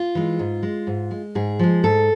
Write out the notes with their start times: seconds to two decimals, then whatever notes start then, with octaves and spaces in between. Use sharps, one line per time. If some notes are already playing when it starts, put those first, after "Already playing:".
Already playing: F4
0.15 E3 G#3
0.39 G#2
0.63 G#3
0.87 G#2
1.11 G#3
1.35 G#2 G#4
1.59 F3 G#3
1.84 G#2 A4